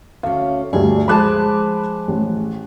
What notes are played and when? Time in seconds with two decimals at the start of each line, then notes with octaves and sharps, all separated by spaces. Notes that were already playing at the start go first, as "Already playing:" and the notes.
0.23 D2 C#4 F5
0.73 D2 G2 G#4
1.08 F3 G#3 A5 B5 D6 F#6
2.08 A1